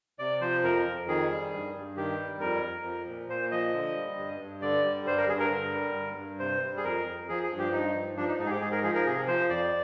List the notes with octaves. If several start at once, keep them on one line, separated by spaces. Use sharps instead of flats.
C3 D5
F3 C5
F2 A#4
F2
D#3 G#4
G3
G2
G2
D#3 G4
G3
F2 A#4
F2
F3
A#2
A#2 C5
F3 D#5
D3
G3
G2
G2
D3 D5
G3
G2 C5
A#4
G2 G#4
A#4
D3
G3
G2
G2
C3 C5
G3
G#4
F2 A#4
F2
F3 G#4
G#4
G2
G4
G2 D#4
F3
F3 D4
D#4
G#2 D#4
G#4
G4
G#2 G#4
A#4
F3 G#4
A#4
C3 G#4
F3 C5
F2 D5